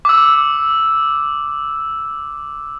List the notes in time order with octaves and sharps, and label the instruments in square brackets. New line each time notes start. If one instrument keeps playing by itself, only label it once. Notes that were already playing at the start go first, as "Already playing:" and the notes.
[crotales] D6 E6